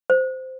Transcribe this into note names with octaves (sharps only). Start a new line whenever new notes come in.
C5